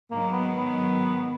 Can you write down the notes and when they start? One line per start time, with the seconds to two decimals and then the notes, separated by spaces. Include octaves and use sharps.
0.11 G#2 D#3 F#3 A#3
0.32 B3
0.53 B3